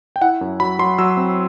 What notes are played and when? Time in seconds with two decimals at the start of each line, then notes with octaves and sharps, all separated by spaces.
0.16 G5
0.22 E4 F#5
0.41 F#2
0.60 F#3 B5
0.79 F#3 C6
0.99 F#3 E6
1.17 C4